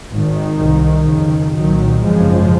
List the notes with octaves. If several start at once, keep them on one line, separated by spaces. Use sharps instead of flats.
G#1 G#2 D#3
C2 C3
F1 F2 C#3
C2 A#2 D#3 F#3
G#1 F#2 C#3 F3 G#3